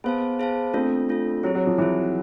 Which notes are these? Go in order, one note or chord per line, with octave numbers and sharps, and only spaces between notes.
B3 G#4 C5 F5 A5
G#4 C5 F5 A5
A3 C4 D4 F4 A4
A3 D4 F4 A4
F#3 C4 E4 G#4
F#3
F3
E3 C4 E4 G#4